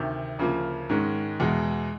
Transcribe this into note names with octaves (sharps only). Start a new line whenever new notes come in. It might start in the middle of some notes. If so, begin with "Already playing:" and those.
Already playing: D2 C3 D#3 G6
D2 C#3 F3 A#3
G#2 D#3 G#3 C#4
E2 B2 G#3